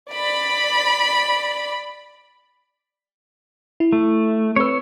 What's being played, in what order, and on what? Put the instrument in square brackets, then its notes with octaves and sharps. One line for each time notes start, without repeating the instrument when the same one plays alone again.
[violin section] D5 B5
[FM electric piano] E4
[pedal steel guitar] A3
[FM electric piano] C4 B4 [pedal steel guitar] C#5 E6